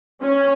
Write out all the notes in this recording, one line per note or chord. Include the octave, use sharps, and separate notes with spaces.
C#4